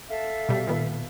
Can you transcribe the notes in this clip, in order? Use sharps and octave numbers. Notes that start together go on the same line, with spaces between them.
A4 E5 F5
B2 G3
A#2 D#3 B3